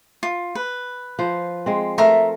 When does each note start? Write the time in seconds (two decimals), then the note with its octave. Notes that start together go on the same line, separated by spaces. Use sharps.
0.23 F4
0.55 B4
1.19 F3 C5
1.66 G#3 C4
1.98 A3 A#4 E5 A#5 C6